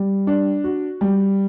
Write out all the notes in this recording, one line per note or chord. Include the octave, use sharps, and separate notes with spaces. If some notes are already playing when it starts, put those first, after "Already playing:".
Already playing: G3
D4
F#4
G3